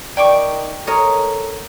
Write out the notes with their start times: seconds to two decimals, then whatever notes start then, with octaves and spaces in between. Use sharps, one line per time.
0.17 D#3 D5 G5 C#6 D6
0.87 A4 A#4 C#5 D#5